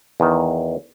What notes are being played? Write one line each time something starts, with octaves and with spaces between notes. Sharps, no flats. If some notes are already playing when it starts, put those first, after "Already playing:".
E2 D#3